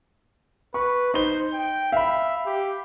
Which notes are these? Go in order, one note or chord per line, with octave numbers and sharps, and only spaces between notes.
B4 C#6
D#4 C5 G7
G5
E5 F5 B5
G4